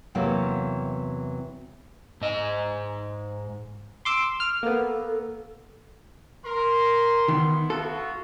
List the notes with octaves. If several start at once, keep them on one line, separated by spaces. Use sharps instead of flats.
E2 C3 E3 F#3 A#3
G#2 D#5
C6 D6 E6
F6
A#3 B3 A4
A#4 C6
D#3 B3 E4
F4 F#4 A4